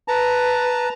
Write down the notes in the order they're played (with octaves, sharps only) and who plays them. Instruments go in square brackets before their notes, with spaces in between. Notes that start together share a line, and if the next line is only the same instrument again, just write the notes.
[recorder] B4 [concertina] A5 A#5